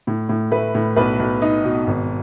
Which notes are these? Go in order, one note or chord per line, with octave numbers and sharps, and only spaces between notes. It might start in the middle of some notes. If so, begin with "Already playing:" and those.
A2
A2
A3 B4 B5
A2
B1 B4 B5
B1
D#4
B2
G#1